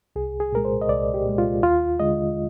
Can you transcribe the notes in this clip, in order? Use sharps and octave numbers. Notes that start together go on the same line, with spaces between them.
C2 G#4
G#4
A#2 G#3 A#4
C5
D#5
C2 D5
G4
A#2 G#3
F4
D#2 F4
D3 G#3 D#5